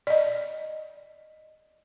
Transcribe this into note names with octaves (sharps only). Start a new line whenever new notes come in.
D5 D#5